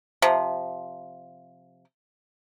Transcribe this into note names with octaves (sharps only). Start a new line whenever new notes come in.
C3 F3